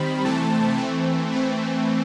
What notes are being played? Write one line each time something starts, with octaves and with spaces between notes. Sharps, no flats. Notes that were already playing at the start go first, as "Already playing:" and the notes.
Already playing: D#3 G3 C4 B5
C3 E3 A3 C4 A5
E3 A3 C4
E3 A3 C4